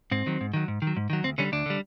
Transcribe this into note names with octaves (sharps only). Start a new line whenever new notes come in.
G#2 C4
D#3 F#3
G#2
D#3 F#3
G#2
D#3
F#3
G#2
D#3 F#3
D2 C4
D3 G3 C#4
D2 D4
D3 G3